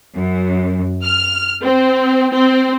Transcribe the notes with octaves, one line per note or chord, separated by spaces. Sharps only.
F#2
F6
C4
C4